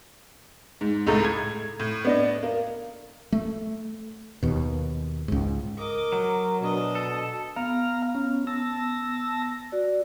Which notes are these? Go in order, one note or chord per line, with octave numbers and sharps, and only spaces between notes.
G#2
C#2 A2 A4 A#5
G#6
A2
B3 D4 D#5
A#3
A3
D#2 B2
C#2 G#2
A#4 D#5 D6
F#3
B2 D4 D#5
A4
B3 F5 A#5 F6
C#4
A5 E6 A#6
F#4 D5